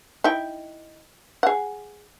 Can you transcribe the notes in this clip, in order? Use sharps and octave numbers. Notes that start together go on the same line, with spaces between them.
D#4 E4 G5
G#4 F#5